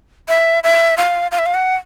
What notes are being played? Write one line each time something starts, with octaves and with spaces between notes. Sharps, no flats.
E5
E5
F5
F5
E5
F5
F#5